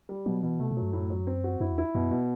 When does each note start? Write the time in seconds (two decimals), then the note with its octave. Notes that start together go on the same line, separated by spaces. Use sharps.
0.09 G3
0.26 B2 F#3
0.43 B2 E3
0.60 C3 A3
0.71 B2
0.77 F#3
0.82 G2
0.93 F#2 A2
1.10 F#3
1.27 C4
1.44 F#4
1.60 F#2 E4
1.72 E2
1.78 E4
1.95 F#2 B2
2.11 B2